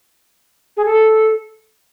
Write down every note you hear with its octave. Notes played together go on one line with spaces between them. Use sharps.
G#4
A4